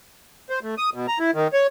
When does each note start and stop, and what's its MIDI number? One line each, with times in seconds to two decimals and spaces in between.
0.50 0.59 72
0.63 0.75 57
0.78 0.90 87
0.94 1.06 47
1.08 1.19 82
1.19 1.31 64
1.34 1.48 51
1.53 1.67 73